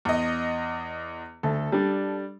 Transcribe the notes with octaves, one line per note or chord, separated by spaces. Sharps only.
E2 D#5
D2 A4
G3 D4